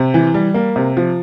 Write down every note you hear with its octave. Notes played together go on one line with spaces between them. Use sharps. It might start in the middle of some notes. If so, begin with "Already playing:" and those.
Already playing: C3
E3
G3
A#3
C3
F3